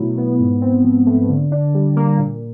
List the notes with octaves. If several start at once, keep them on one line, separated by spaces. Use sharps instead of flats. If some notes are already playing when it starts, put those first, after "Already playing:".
Already playing: B2 F#3 A3 E4
B3
G#2
C4
F3
A3
D3
D4
G3
A#3
A#2